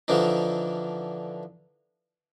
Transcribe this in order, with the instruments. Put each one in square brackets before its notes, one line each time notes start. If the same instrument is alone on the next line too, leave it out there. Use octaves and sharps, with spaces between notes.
[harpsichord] D3 E3 F3 D4 D#4